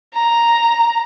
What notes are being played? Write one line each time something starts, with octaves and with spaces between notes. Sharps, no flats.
A#5